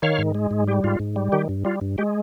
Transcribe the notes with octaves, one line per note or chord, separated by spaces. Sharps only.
D#3 C#5 F5
G#2
G#3
G#2
G3 G4
G#2 F4
G#2
G3
D#3 G4
G2
G3 F4
G2
G#3 G4